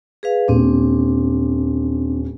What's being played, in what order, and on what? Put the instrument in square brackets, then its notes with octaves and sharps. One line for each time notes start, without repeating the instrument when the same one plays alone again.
[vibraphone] G#4 B4 F5
[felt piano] D#1 [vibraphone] C4 D4